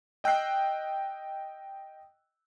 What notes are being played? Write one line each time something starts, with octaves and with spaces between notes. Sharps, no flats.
D#5 G5 E6 F#6 C7